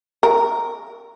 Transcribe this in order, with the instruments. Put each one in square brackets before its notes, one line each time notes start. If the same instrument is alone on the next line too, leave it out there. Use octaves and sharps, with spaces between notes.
[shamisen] A#4